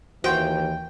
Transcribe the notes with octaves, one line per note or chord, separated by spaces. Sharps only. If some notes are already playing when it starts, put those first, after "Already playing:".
D#2 E3 F#4 C5 G5